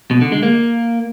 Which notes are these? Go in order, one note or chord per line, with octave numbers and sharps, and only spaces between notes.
B2
D3
G#3
A#3